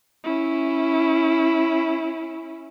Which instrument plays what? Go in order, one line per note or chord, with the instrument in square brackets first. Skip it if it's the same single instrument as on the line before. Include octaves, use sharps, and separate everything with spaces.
[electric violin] C#4 E4